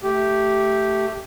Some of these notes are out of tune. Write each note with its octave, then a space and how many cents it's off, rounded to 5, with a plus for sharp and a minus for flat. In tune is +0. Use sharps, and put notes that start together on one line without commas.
A3 +0 G4 -5